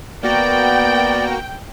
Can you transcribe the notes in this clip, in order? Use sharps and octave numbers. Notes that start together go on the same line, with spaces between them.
A#3 B3 F#4 D5 G5 A#5